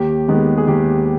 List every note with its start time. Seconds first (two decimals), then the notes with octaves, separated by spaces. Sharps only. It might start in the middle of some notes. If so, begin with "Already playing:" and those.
Already playing: D#2 G4
0.28 D#3 G#3 B3
0.57 G#4
0.67 D#2 G4